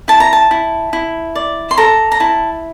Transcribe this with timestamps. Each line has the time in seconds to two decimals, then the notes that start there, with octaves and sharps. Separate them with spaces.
0.08 E4 A5
0.20 A#5
0.33 A5
0.51 E4
0.93 E4
1.35 D5
1.71 C6
1.77 A4 A#5
2.12 A#5
2.20 E4 A5